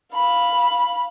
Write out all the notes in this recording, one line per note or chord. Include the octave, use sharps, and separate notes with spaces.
F5 B5